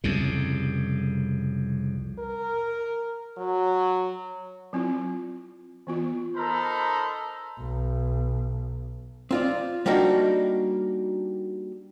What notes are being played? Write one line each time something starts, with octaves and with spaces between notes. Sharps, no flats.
C2 F2 C#3
A#4
F#3
F#3 C4 E4 F4
E3 B3 F4
D#4 A4 A#4 C5 A#5 B5
B1
C4 F4 D5
G3 A#3 D4 D#4 F#4